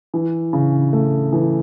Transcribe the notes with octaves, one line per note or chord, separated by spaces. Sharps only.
E3
C#3
A3
E3